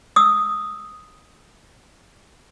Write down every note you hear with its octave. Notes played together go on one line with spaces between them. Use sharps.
D#6 E6